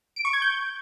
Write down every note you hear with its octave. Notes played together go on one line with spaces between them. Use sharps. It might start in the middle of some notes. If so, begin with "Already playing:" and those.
D7
C#6
G#6
G6